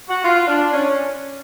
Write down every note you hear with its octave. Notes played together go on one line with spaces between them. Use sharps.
F#4
F4
D4
C#4